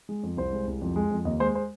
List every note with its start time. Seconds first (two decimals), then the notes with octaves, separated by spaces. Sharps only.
0.09 G#3
0.23 F2
0.37 C2 C5
0.53 G#3
0.67 C2
0.82 F2
0.96 G#3
1.11 F2
1.25 D#2 D#5
1.40 G#3 C5
1.55 C5